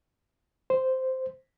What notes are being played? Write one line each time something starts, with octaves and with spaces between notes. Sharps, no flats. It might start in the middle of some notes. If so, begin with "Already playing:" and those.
C5